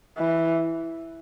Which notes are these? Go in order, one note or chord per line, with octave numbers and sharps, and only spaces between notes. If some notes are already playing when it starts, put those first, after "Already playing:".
E3